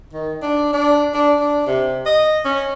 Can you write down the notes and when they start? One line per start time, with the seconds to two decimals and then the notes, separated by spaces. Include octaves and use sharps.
0.13 D#3
0.42 D4
0.73 D4
1.14 D4
1.41 D4
1.67 C3
2.06 D#5
2.45 C#4